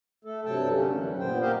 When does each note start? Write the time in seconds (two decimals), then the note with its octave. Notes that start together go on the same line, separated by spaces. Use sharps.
0.25 A3 A4
0.45 G2 C3 F#3 A4 G5 A5
0.72 D3 A3 A#3 C#4
0.93 F#2 D3 E3 F#3 G3
1.19 A#2 B3 C5 G5
1.41 A#3 G4 A#4 C5 D#5 F5